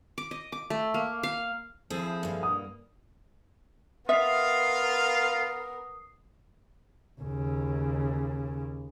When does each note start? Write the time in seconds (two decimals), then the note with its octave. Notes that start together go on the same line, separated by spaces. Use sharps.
0.18 D6
0.31 D#5
0.52 D6
0.70 A3
0.94 A#3
1.23 F5
1.90 F3 C4 E4 G#4 A4
2.23 G2 A#3
2.43 D#6
4.09 B3 F4 A#4 E5 F5 D#6 C7
7.21 D#2 C#3